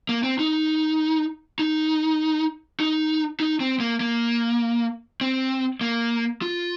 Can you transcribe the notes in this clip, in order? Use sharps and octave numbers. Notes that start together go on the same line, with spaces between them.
A#3
C4
D#4
D#4
D#4
D#4
C4
A#3
A#3
C4
A#3
F4